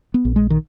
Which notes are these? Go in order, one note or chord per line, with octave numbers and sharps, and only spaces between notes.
B3
A#1
G#3
D#3